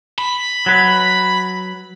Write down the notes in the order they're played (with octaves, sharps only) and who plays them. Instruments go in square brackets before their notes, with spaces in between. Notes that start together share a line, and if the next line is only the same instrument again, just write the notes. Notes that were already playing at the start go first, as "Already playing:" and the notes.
[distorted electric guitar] B5
[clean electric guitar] F#3 B4